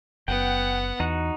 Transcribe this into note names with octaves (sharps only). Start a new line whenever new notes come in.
F#1 B3 F#5 G5
E2 D#4 F#4 F#5